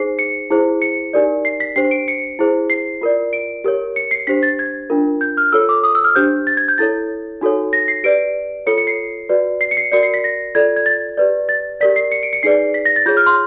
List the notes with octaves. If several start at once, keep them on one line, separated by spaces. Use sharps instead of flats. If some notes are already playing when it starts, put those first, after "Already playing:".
Already playing: D#4 G#4 C5 C7
C#7
E4 G#4 C5
C#7
D#4 G4 A#4 D5
C7
B6
D4 G4 C5 C7
D7
C#7
E4 G#4 C5
C7
F4 A#4 D5
D7
G4 A#4 C#5
C#7
C7
D4 G4 C5 B6
A6
G#6
D4 F4 A#4
G6
F6
F4 A4 C#5 E6
D6
D#6
E6
F6
D4 G4 C5 G6
A6
G#6
G6
E4 A4 C#5 A6
D#4 F#4 A4 C#5
A#6
C7
G4 B4 D5 D7
F4 A4 C#5 C#7
C#7
C7
F#4 B4 D5
C7
C#7
C7
F#4 A#4 D5 C#7
C7
B6
A#6
F4 A4 D5 G#6
G#6
A6
G4 B4 D5
A6
G4 A#4 D5 B6
C7
C#7
D7
C#7
D#4 G#4 B4 D5 C7
B6
A#6
A6
F4 G#4 C#5 G6
F6
C6